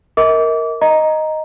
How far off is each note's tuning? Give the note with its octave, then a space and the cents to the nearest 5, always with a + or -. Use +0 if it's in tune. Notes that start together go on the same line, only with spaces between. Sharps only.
A#4 +0 D#5 +40 D6 -30
D#5 +0 A#5 +0